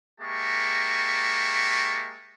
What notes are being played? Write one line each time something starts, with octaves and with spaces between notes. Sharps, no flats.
G#3 A#3 G4 E5 A5 C#6